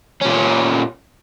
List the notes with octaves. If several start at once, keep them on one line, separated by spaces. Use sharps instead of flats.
A#2 C#4